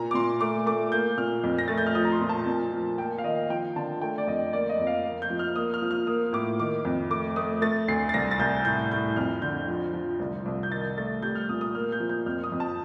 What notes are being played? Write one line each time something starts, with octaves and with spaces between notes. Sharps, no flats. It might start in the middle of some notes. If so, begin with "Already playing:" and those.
Already playing: A#2 A#5
D6
A#2 C6
A3 D6
A3 D6
A#3 G6
A#2 F6
F2
A#6
A3 A6
G6
F6
F3 D#6
A#5
C6
A#2
A5
A#2
F3
A#3 G5
F5
D#3 D#5
F3 G5
D3 A5
A3 G5
D5
F2 D#5
A#3 D5
D#5
F2
F5
A#3
G6
F3
F6
A#3 D#6
F6
F3
F6
A#3 D#6
A2 D6
D#3 D6
F2
A3 D6
A3 D#6
A3 A6
D2 C7
A6
C2 A#6
A6
C2 G6
A2 G6
A2 G6
F2 F6
D3 G6
F3
F3
C2
C2
G6
D#3 A6
A3 A6
G3 G6
F6
A#2 D#6
D#6
A#3 F6
G6
F3
G6
F2 F6
D#6
F2
A5